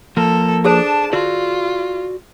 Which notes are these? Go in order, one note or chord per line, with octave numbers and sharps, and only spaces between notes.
F3 A#3 A4 A#4
D4 G#4 A4 C5 A5
F4 F#4 D5